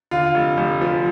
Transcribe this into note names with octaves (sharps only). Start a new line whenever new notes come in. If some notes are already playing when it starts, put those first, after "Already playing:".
D3 F4
F1
F1
F3